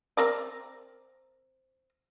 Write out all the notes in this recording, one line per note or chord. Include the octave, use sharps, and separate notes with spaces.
C4 A#4 D5